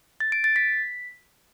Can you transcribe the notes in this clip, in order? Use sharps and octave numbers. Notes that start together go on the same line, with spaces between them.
A6
D7
A6
B6